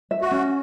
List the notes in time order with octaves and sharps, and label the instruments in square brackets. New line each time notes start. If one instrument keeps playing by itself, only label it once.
[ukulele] E5
[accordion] F#4
[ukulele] C#4